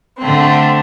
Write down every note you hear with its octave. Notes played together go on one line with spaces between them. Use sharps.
D3 A3 C4